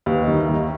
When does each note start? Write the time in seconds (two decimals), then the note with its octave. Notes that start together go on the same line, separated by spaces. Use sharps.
0.06 D#2 B4
0.22 D#5
0.27 D#3
0.39 E5
0.49 D#2
0.54 D#5